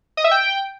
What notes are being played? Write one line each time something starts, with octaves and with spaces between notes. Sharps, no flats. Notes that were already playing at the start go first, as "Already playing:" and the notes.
D#5
E5
G5